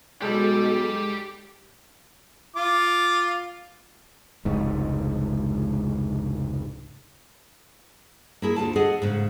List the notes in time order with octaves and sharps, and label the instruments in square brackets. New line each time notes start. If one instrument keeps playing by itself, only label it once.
[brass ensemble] B1 [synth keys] G#3 A4 [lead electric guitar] G4 D5
[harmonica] F4 D6
[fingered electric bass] F1 C#2 G#2
[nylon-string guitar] A#3 E4 G#4
D2 A#2 F4 A5
G#4 A4 D#5 F#5
G#2 C#3